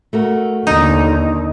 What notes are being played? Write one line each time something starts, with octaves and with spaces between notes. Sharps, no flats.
A3 F#4 A#4
D#2 D3 D#4